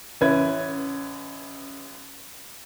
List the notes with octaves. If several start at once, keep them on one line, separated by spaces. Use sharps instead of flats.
A1 C#4 E4 B4 G#6